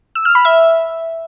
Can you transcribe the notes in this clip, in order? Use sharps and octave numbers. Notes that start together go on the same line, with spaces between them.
E6
F6
B5
E5